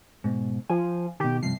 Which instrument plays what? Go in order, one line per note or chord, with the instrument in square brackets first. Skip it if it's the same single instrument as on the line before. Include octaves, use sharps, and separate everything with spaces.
[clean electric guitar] G#2 B2
[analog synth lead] F3 [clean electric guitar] G#5
[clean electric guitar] B2 D#3 [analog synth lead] G4
[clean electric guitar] G2 C3 F3 [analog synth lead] C7